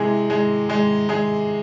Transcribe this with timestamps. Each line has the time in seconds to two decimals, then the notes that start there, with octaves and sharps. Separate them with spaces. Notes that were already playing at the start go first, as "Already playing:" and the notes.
Already playing: C3 E3 G#3 G#4
0.30 G#3 G#4
0.69 G#3 G#4
1.09 G#3 G#4